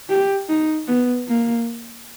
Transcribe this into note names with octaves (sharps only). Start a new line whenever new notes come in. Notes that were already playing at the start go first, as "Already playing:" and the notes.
G4
D#4
B3
A#3